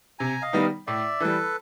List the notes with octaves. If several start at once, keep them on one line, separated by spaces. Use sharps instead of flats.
C3 G#5 A#5
D#5 F5
D#3 G3 B3 D#4
A2 D5 E5
E3 G3 A4 B4